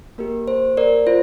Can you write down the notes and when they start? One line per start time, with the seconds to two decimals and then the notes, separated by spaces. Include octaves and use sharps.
0.18 A#3 G4 A#4
0.48 C5
0.77 A#4 D5
1.07 F4 C5